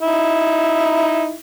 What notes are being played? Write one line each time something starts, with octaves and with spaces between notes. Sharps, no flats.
D#4 E4